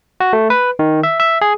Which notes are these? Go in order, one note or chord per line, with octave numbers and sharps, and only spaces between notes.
F#4
A3
B4
D#3
E5
E5
G#4